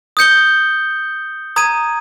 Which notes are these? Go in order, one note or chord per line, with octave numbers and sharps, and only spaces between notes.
D#6 G6 C#7 G7
A#5 D#6 G#6 D#7